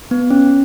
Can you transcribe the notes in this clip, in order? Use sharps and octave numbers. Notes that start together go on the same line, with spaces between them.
B3
C#4